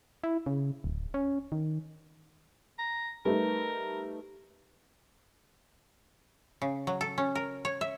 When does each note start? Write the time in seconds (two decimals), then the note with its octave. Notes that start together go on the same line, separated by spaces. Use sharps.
0.24 E4
0.46 C#3
0.84 D1
1.14 C#4
1.52 D#3
2.79 A#5
3.25 G3 A3 D#4 A#4 B4
6.62 C#3
6.87 F#3
7.01 A4
7.18 C#4
7.35 A#4
7.65 C#5
7.81 E5